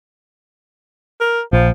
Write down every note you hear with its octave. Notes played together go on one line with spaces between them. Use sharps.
A#4
A#1 F3